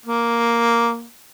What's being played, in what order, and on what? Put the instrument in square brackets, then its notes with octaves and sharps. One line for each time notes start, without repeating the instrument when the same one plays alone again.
[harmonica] A#3